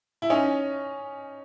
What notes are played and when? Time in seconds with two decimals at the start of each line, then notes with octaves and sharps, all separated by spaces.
0.22 E4
0.30 C#4 D#4